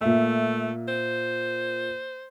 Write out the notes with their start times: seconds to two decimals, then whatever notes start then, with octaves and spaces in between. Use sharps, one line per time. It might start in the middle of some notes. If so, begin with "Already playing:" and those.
0.01 A#2 A3 E5
0.88 C5